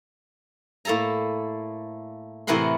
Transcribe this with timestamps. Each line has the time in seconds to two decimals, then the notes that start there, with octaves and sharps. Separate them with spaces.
0.85 A2 A#3 A4 A5 A#5
2.47 A2 C3 E3 A#4 F#5 C6